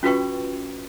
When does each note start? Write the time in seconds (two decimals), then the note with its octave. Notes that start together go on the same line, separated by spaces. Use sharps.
0.03 C#4 F4 F#4 B4 G5 C#6